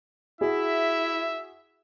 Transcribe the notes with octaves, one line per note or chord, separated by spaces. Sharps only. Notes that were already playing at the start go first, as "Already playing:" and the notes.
E4 F#4 G#4 E5